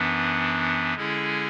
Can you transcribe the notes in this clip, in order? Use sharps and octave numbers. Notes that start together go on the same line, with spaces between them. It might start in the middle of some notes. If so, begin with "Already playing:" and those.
Already playing: F#2 E3 B3 D4
D3 G#3 C#4 E4 G#4